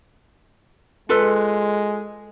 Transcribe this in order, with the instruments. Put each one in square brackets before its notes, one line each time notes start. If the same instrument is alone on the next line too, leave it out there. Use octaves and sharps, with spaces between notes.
[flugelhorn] G#3 [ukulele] F4 A4 B4